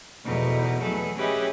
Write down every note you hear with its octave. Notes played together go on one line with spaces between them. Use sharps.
E2 B2 D3 F3 D#4
F#3 A3 G#4 A4 B4
C#4 G4 G#4 B4 D#5 E5